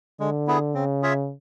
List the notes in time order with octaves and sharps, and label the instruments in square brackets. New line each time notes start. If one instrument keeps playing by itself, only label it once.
[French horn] D3 [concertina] G#3
[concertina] B3 E4 G#4
[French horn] C#3 [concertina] C4
[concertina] F4 G#4 C#5 E5